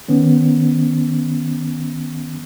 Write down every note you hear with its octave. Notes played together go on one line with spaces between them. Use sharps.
D#3 B3 C#4